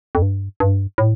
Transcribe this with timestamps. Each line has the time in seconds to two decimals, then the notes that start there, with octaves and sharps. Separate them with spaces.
0.15 F2
0.22 G2
0.60 G2
0.98 A2